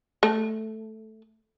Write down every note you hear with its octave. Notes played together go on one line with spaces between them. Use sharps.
A3